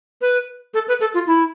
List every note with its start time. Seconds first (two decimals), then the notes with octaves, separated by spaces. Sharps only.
0.21 B4
0.74 A4
0.88 B4
1.00 A4
1.14 F4
1.27 E4